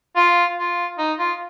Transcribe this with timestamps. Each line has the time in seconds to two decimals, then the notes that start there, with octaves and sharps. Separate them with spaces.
0.16 F4
0.58 F4
0.98 D#4
1.19 F4